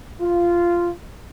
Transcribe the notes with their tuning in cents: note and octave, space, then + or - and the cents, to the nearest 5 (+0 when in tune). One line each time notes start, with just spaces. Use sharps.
F4 -10